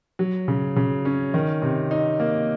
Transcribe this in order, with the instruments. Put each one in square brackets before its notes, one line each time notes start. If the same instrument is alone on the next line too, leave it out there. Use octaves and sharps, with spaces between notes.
[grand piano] F#3
C#3
C#3
C#4
D#3
C3
D#4
A#3